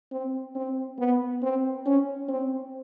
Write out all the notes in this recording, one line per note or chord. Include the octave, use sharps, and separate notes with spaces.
C4
C4
B3
C4
C#4
C4